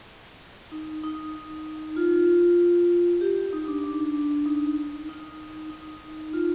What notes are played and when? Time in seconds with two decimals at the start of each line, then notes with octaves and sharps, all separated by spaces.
0.72 D#4
1.04 D#4
1.96 F4
3.21 G4
3.53 D#4
3.68 D4
3.84 D4
4.46 D#4
5.09 D#4
5.70 D#4
6.33 F4